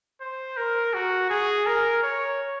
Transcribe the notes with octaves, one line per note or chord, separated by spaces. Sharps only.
C5
A#4
F#4
G#4
A#4
C#5